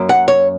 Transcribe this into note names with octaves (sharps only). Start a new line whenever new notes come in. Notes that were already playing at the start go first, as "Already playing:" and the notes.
Already playing: F#2 F#3 A#3
F#5
C#5